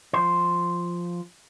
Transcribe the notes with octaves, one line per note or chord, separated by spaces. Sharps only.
F3 C5